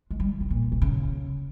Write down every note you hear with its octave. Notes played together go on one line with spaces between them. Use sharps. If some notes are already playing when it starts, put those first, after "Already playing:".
G#3
G3
C3
A#2
C3
C#3